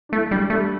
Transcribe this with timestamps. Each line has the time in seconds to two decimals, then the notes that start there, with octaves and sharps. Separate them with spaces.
0.09 D4
0.12 A3 E4
0.31 G3 D4
0.50 G3 A3